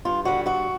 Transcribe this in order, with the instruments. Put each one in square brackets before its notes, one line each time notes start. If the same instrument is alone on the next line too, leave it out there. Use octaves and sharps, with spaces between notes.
[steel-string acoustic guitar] G2 F4
D3 G3 F#4
G2 F#4